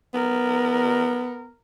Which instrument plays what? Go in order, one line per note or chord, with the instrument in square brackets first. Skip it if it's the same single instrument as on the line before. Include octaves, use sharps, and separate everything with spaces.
[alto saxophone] B3 [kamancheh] A#4